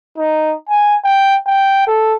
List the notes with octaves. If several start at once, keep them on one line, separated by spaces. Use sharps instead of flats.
D#4
G#5
G5
G5
A4